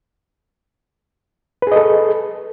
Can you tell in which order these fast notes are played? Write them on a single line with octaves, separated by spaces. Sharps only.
B4 G#4 D#5 A4